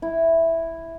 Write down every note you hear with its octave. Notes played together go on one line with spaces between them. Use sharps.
E4